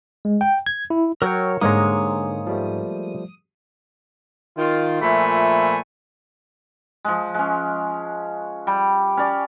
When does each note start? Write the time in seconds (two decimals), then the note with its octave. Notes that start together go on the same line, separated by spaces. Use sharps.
0.25 G#3
0.41 G5
0.66 G#6
0.90 E4
1.22 F#3 A#4 C#5 G5 F6
1.61 G#2 D3 G#3 A#3 C#5 D#6
2.46 F3 G3 A3
4.57 D#3 F4
5.02 A#2 F3 A3 E5 G#5 B5
7.05 F3 G#3
7.34 G#3 C#4
8.67 G3
9.17 C#4 D5